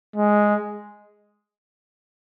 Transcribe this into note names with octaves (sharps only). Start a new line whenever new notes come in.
G#3